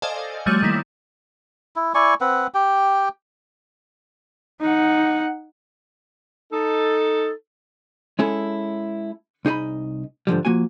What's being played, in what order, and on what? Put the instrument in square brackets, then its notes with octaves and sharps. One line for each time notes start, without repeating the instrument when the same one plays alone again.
[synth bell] A4 C5 D5 D#5 F5 G#5
F3 G3 A3 F#4 C#5 D#7
D#3 G3 A#3 E4
[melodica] E4
E4 D5 G#5 C#6
C4 B4 F#5
G4 G5
[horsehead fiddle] D#4 F#5
[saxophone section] D#4 A4
[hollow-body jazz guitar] G#3 C#4 E4 G#4 A4
C2 D#4 G#4 D#5 B5
G#2 D3 F3 G3
F3 A#3 F#4 G#5